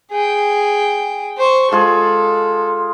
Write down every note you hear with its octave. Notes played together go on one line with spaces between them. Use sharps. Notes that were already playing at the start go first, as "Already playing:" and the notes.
G#4 G5
C5 C#6
G#3 F4 G#4 A4